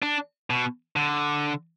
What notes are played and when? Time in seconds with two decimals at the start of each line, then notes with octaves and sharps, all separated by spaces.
0.02 D4
0.50 B2
0.96 D3